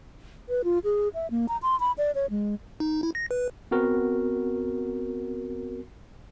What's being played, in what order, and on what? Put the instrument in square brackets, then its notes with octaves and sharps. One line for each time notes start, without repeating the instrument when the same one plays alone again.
[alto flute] B4
F4
G#4
E5
A#3
A#5
C6
B5
D5
C#5
G#3
[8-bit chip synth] D#4
E4
A#6
B4
[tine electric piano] B3 C4 F#4 A#4